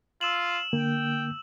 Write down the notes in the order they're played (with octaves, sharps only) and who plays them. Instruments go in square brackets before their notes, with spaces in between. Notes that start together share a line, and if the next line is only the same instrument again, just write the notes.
[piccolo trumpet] F4 [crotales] E6 E7 F#7
[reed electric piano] D3 A#3 [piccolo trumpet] G5